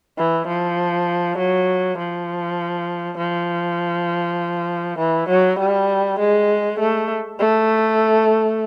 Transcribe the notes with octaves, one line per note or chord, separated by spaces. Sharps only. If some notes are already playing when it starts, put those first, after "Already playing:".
E3
F3
F#3
F3
F3
E3
F#3
G3
G#3
A3
A3